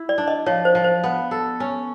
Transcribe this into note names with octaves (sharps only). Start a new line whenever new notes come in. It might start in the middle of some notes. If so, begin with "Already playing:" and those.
Already playing: E4
D5
D4
D#5
F3 C#5
C5
F3
C5
B3
A4
C#4